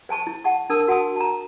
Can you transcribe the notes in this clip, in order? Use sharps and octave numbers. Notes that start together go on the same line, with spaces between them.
C5 G#5 A5 C#6
E4
F#5 A5 C#6
D4 A#4 A5 D#6 E6
F#4 F#5 G#5 A5 D#6
A5 A#5